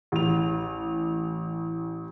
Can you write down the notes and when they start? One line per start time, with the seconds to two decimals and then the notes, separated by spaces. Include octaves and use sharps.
0.12 A1 F7